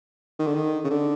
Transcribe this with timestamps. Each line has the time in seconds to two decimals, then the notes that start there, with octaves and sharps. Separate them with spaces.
0.39 D#3
0.46 D3
0.54 D#3
0.84 C#3
0.90 D3